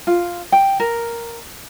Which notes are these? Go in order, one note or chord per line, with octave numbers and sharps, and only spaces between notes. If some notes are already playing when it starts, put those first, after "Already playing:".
F4
G5
A#4